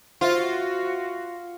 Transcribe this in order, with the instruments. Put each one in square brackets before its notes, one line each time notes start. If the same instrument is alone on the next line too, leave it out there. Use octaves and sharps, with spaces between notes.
[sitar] F4 [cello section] F#4 [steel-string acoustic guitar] C5 E5 F#5